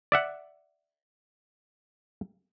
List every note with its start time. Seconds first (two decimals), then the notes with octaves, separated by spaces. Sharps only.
0.12 D5 E5 F#5